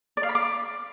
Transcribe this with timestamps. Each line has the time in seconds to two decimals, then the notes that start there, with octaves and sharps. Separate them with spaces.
0.17 D5
0.23 F5
0.29 B5
0.35 D6